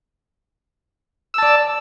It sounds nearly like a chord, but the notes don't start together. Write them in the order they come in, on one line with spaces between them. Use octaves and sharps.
E6 A5 D5